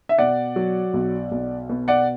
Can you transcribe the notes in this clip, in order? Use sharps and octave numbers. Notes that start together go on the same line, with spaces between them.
E5
B2 D5 F#5
F#3
B1
B1
B2
D5 F#5